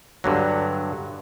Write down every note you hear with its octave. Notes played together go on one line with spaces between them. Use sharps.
G2 D3 F#3